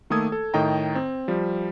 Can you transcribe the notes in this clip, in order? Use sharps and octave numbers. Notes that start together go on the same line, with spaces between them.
D#3 A3 A#3 A4 D#6 G#6
A4
A2 D#3 D#5 G5 A#5
C4
F3 G3